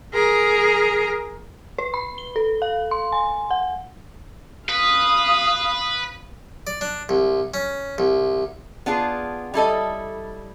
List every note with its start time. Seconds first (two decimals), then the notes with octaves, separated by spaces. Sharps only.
0.13 G#4 A#4
1.78 B4
1.94 B5
2.18 G7
2.36 A4
2.62 F5
2.91 C6
3.12 G#5
3.51 F#5
4.69 B4 F5 D#6
6.67 D5
6.81 D4
7.09 C2
7.54 C#4
7.98 C2
8.86 B3 D4 F4 G#4
9.54 G3 E4 A4 D#5